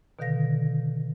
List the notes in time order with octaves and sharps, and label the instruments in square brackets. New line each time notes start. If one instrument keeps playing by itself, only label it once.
[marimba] B2 D3 D#3 A4 F5 A#6